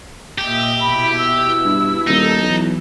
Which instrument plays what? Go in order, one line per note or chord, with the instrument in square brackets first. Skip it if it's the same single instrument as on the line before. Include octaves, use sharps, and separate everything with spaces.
[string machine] A#2 D#5 E5 [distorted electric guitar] G4
[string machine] B2 E4 [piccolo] B5
[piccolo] E6
[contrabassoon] G2
[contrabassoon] D#1 [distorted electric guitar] D#4 [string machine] A4 A5
[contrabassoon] B1 [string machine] E3